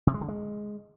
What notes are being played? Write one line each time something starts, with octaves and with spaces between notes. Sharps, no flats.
C3
G#3
D3
G#3